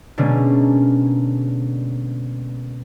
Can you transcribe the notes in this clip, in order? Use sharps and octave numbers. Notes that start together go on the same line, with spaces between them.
B2 D3 G#3 A#3 C#4